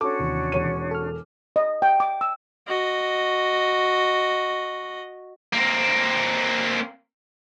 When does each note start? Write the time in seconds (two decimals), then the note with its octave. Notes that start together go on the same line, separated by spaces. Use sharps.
0.01 C#4 D4 F#4 A4 D6
0.19 D#2 C3 E3
0.52 E1 C#5 D#7
0.91 A4 F6
1.56 D#5
1.82 G5
2.00 D6
2.21 E6
2.67 F#4 D#5
5.53 A#3 C4